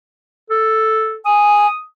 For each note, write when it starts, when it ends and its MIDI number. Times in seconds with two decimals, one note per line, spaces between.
0.50 1.18 69
1.26 1.67 80
1.26 1.80 87